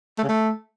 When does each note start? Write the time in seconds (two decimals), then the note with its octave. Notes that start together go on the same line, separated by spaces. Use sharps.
0.18 A3
0.24 C#3
0.29 A3